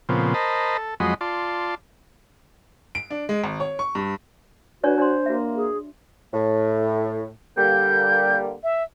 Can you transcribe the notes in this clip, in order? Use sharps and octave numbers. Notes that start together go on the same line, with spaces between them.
A#2 C#3 F3 B3 C4
A#4 C5 D#5 A5 B5
A4
F2 F#3 G#3 D#5 B5 C6
F4 D5 A5 C6
D7
D4
G#3
G#1
C#5
C#6
G2
D4 F#4 B4 C#5 D5
D4 C5 D5 C6
A#3 F#4 E5
G#4
A2
D3 G3 A#3 G6
E5